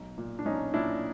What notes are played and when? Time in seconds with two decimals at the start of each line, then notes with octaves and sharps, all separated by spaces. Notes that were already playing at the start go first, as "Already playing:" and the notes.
Already playing: B1
0.18 A#2
0.39 D4
0.45 B1 C#4 D#4
0.74 A#2 D4 E4